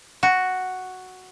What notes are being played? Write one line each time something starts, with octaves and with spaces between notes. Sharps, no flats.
F#4